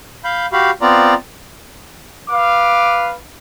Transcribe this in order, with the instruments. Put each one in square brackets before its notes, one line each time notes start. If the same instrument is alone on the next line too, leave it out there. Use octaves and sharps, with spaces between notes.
[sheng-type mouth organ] F5 B5 G6
F#4 G4 F5 B5
B3 C4 F4 D5 A#5
[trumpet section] B4 F5 D6